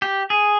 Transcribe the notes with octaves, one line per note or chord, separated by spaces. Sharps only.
G4
G#4